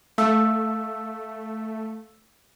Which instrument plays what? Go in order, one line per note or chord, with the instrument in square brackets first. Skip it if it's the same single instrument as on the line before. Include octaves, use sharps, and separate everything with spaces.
[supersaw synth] A3 [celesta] F5 E6